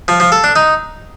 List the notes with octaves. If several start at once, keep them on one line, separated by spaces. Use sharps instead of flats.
F3
F3
A4
D4
D#4